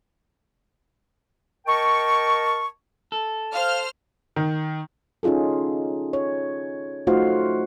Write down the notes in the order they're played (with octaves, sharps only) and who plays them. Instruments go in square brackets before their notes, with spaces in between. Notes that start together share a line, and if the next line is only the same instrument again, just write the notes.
[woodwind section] A#4 D#5 G5 A5 C#6
[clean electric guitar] A4
[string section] C5 F6 [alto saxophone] F5
[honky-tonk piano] D#3
[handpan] C#4 D#4 F4 G#4 A4
C#5
A3 D#4 F4 F#4 C5 F5